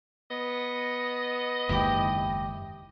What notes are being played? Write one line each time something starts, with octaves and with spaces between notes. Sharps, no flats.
B3 D#5
F#1 D#2 G#2 E4 G4